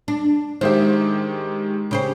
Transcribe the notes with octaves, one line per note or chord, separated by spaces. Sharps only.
D4
D#3 G#3 G4 C5 E5
C#3 G4 C5